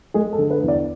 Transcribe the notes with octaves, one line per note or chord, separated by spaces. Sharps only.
G#3 G#4
A4
D3
B4
E2
D5